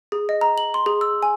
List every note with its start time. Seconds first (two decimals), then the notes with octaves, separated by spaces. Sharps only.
0.12 G#4
0.29 D#5
0.41 A#5
0.58 F#7
0.74 C6
0.86 G#4
1.01 E6
1.23 G#5